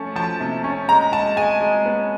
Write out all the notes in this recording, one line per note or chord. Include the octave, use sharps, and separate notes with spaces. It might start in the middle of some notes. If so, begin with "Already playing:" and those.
Already playing: F3 A3 C#4 A5
F3 A5
C3
C#4
G#3 A#5
G#3 A5
G#3 G#5
G#3
B3